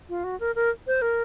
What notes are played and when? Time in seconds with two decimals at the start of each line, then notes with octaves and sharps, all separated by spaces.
0.09 F4
0.24 F#4
0.40 A#4
0.55 A#4
0.87 C5
1.02 A#4